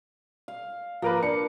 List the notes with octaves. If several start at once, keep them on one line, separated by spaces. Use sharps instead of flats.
F5
F3 A#3 A#4 B4 D6
D4 C#7